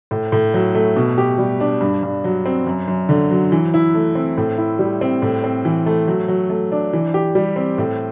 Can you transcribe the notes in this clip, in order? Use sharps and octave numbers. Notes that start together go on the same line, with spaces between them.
A2
A2
F#3
A3
B2
G4
G3
D4
G2
G2
F#3
C4
F#2
F#2
D3
F#3
E3
E4
A3
C4
A2
E4
G3
C4
A2
C4
E3
A3
F#3
F#3
A3
D4
E3
G4
G3
C4
A2